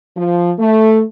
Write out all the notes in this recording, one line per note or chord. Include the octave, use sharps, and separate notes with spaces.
F3
A3